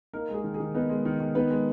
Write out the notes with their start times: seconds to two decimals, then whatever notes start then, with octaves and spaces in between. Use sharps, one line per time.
0.14 A#3 D#4 A#4
0.29 G#3
0.34 G#4
0.44 D#3
0.54 G#4
0.60 D#3
0.75 B3 D#4 B4
0.89 G#3
1.05 D#3
1.20 D#3
1.35 B3 D#4 B4
1.50 G#3